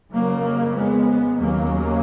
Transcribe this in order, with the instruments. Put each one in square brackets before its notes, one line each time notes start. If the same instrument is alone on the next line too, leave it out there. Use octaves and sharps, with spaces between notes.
[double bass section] F2 C#3 F#3 A#3
G#3 B3
D#2 C#3 F#3 A#3